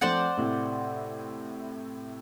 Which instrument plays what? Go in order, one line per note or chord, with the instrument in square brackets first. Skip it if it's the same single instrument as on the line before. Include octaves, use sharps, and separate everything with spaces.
[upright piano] F3 A3 C4 [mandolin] C5 D5 F#5
[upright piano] A2 C3 E4